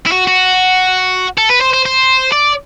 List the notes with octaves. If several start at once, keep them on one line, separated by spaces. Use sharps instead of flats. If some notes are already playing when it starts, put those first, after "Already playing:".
E4
F#4
F#4
A4
B4
C5
C5
C5
D5